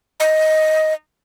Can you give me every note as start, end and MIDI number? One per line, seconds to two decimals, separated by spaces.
0.20 0.94 75